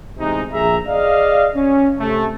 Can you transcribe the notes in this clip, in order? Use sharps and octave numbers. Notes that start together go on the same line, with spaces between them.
A1 C3 G#3 D#4
A#1 G#4 E5 A#5
G#4 D5 D#5 F5
C#4
C3 A3